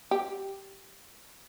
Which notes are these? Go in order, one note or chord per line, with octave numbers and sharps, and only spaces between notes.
G4